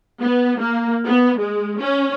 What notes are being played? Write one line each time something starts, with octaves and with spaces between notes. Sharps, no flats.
B3
A#3
B3
G#3
C#4